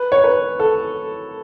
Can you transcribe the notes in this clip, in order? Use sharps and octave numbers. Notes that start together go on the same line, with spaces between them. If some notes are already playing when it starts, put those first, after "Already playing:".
Already playing: B4
C#5
B4
A4